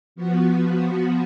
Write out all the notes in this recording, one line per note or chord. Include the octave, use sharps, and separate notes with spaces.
F3 B3 F#4